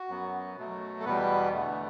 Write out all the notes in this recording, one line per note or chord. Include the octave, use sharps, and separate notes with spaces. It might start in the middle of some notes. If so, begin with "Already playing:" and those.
Already playing: F#4
F#2 F#3 B3
B2 F#3 A3
A4
E2 B2 G3 B3 B4
E2 D3 A3